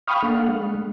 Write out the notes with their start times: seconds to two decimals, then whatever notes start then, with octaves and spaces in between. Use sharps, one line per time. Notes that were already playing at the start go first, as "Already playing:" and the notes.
0.08 F5 G5 B5 C#6 D#6 F6
0.22 A#3 D4 A4 F5 F#5
0.49 G#3